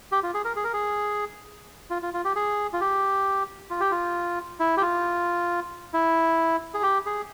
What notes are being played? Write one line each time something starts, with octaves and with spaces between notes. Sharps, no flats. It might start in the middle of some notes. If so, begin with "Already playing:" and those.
G4
F4
G#4
A#4
G#4
A#4
G#4
F4
F4
F4
G4
G#4
F4
G4
F4
G4
F4
E4
G4
F4
E4
G#4
G4
G#4